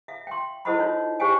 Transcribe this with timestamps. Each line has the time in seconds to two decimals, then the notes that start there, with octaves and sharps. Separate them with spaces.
0.08 E5 F5
0.27 G5 C6
0.65 E4 A4 C5 D#5 F#5 B5
0.79 D#4 F4 C#5
1.20 G4 C5 C#5 F5 G5 G#5